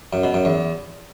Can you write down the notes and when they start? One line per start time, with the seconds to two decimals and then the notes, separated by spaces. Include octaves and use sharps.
0.13 F#2
0.24 B2
0.34 F#2
0.45 E2